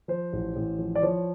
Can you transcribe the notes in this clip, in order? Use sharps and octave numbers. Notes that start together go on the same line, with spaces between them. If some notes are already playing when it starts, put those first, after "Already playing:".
F3 C5
A1
A1
F3
D5
F3 C#5